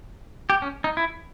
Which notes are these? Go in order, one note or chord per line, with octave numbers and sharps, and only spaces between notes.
G4
C#4
D#4
E4